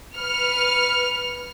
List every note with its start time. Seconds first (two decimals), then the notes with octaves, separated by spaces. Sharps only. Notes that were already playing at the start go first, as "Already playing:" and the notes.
0.17 B4 F6 C#7